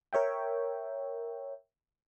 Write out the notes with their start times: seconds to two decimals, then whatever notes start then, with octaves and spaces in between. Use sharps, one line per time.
0.13 A#4 C#5 E5 G5